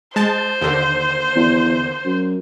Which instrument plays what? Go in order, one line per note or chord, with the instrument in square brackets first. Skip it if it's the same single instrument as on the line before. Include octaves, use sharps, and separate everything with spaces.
[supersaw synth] G#3 A5 [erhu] C5
[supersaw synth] D#2 D3
[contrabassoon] E2
F#2